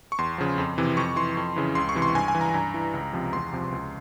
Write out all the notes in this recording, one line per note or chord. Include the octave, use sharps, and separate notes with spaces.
C#6
E2 C6
C#3 F3
F2
C3 E3
F2 C#6
E3 C6
F2
C#3 E3
C#2 C6
C#6
C3 E3
C6
G2 G#5
G#5
E3
A#5
G2
E3
C#2
C3 F3
E2 C6
C3 F3
C#2